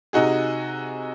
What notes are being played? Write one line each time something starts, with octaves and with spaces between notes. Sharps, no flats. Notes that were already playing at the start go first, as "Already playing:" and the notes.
C3 D#4 F#4 G#4